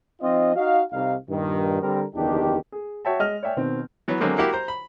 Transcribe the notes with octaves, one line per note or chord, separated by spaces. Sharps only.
F3 C4 D#4 F4 D#5
D#4 F#4 D#5 F5
C2 D#4 F5
G2 A#2 D#3
D3 G3 C4 A#4
F#1 E2 D#3 D4 D#4 G4
G#4
F#4 C#5 E5 G5 A5
G#3 D#5 F6
C#5 D5 E5 G5 G#5
B2 D#3 C4
E3 F#3 B3
D3 F#3 G#3 A#3 C4 G#4
A#3 E4 F#4 G4
C5 A#5
B5